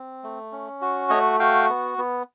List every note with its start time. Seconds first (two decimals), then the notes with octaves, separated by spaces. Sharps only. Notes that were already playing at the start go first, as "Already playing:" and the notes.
Already playing: C4
0.24 A3
0.52 C#4
0.82 F#4
1.10 A3 C#5 D#5
1.40 F#4 F5 G5
1.69 B3
1.98 B3